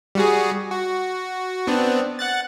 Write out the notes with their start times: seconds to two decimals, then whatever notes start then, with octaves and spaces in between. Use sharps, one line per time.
0.15 G3 F#4 G#4
0.71 F#4
1.67 B3 C4 D4
2.19 F#5 F#6 A6